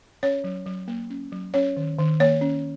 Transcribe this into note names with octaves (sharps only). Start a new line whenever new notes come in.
C#4 C#5
F#3
F#3
A#3
C#4
F#3
C#4 C#5
D#3
D#3
A#3 C#5
C#4